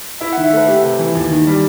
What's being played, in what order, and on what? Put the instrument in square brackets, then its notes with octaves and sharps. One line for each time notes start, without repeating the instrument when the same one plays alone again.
[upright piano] E4 [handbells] E5
[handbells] F#5
[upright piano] D#3
[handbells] E5
[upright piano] A3 [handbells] B4
[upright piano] A3 [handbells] G4
[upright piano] C3
E3
D#2
D#3
G3